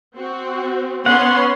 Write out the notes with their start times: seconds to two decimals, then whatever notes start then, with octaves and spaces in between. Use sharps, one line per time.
0.16 C4 F#4
1.06 B3 C#4 F#5 C6